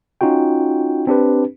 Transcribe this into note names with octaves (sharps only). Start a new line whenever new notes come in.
C#4 D#4 F4 F#4 G5
C4 D4 G4 B4